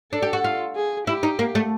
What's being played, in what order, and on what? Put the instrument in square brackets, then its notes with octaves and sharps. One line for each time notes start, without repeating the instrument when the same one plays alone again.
[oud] D4 [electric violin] A4
[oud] G4
F#4
F4
[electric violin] G#4
[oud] E4 [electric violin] G4
[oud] D#4
A#3
A3